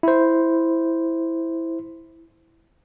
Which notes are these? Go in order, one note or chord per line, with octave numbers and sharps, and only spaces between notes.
E4 C5